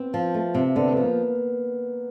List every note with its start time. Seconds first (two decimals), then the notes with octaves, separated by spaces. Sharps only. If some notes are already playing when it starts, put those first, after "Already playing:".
Already playing: B3 C4
0.14 F3
0.35 A3
0.55 C3
0.76 D3 B3
0.92 F3 B3
1.03 A#3